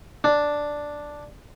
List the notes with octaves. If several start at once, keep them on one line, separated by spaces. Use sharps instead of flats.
D4